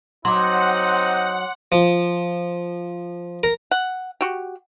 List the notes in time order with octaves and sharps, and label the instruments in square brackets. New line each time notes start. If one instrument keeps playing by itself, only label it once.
[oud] F#3 [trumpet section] C4 D#4 [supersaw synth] F#5 [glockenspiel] C6 D6
[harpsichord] F3
A#4
[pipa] F#5
F#4 G4